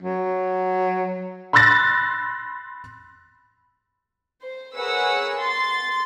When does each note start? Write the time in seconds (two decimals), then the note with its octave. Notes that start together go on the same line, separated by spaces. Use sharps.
0.02 F#3
1.53 B5 C6 E6 F#6 A6 A#6
4.43 C5
4.77 G#4 A#4 B4 C#5 F#5 E6
5.40 C6 A6